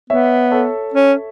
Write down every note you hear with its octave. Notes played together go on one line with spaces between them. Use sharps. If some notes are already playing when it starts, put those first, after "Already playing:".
B3 C#5 E5
A4 C#5
C#4